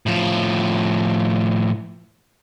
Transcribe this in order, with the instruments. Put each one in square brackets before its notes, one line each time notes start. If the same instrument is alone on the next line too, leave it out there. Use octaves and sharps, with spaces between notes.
[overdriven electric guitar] A2 F3